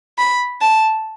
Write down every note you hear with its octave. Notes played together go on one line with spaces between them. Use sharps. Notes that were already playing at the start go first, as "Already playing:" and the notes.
B5
A5